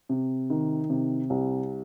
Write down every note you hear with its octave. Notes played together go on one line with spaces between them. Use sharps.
C3
D#3
C3
C2